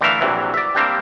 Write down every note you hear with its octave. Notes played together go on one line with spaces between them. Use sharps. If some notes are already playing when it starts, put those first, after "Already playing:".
D3 E3 A3 A#4 E5 F5
A#1 C3 E3 F#3
D5 E5
G3 A#3 C4 D4 G4